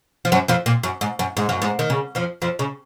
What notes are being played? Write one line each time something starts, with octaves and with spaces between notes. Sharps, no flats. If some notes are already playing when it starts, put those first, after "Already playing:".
F3
F#2 F#3
F2 F3
A#2
F#2
G#2
F#2
G#2
F#2
G#2
D#3
C#3
F2 F3
F2 F3
C#3